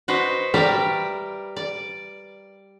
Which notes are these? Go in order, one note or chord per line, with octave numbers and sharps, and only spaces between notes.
F#4 B4 C5 D#5
G3 G4 A#4 B4 D5 E5
D5